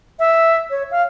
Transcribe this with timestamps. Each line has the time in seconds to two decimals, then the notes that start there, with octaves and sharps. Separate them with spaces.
0.19 E5
0.71 C#5
0.91 F5